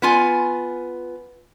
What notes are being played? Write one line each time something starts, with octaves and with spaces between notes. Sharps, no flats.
B3 F4 G#5